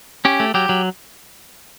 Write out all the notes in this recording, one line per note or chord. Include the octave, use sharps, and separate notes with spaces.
C#4 G4
A3
F#3 G4
F#3